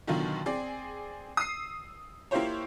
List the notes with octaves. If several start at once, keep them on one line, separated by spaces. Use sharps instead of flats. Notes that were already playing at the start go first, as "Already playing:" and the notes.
B2 D3 D#3 F#3 F4
C4 G#4 D5
D#6 E6 C7
A#3 E4 F4 G4 C5 C#5